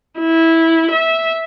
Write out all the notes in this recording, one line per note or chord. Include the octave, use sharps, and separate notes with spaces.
E4
E5